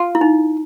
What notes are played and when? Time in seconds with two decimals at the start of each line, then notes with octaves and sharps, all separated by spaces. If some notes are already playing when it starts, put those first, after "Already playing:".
Already playing: F4
0.15 E4
0.21 D#4